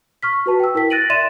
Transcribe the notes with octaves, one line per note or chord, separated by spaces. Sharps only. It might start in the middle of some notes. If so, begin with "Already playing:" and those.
C#6 F6 B6
F#4 B4 A5
G5 E6
E4 A#4 G5 B6
F#6 A6 A#6 D7 D#7 F#7
D5 E5 C6 A6 D#7 E7